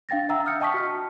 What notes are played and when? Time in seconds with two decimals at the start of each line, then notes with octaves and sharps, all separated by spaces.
0.09 D4 F5 G5 A6 A#6
0.29 E5 F#5 G5 A#5 E6
0.45 D#6 F6 G6 C#7
0.60 D#5 G5 A5 C#6 D#6 B6
0.74 F#4 F6